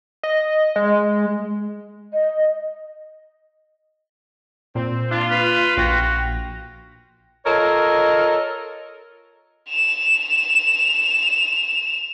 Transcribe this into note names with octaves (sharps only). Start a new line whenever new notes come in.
D#5
G#3
D#5
A#2 C4
D4 F4
B4
A#1 F#4 G5 A#6
F4 A4 A#4 C#5 D#5
E7 F7